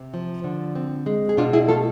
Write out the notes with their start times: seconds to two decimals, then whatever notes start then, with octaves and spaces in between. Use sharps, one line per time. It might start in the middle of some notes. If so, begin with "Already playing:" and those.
Already playing: C3
0.14 F3
0.44 D3
0.75 C4
1.06 G#3
1.29 G#4
1.37 B2 D4 F4
1.53 E4 G#4
1.68 A3 F4 A4